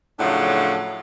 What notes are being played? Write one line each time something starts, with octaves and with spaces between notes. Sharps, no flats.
A2 C#3 F3 F#3 D4